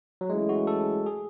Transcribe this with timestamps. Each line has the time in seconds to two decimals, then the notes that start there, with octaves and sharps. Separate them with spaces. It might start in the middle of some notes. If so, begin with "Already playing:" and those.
0.21 F#3
0.30 E3 G#3 A3 C#4 E4 G#4
0.49 F#4
0.67 A4
1.06 G#4